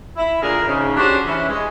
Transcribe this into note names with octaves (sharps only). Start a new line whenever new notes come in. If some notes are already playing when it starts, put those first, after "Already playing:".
E4
A#2 D3 G#4 A#4
G#2 C#3
C#4 D4 F#4 G4 C5 C#5
E3 C#4 E4
G#3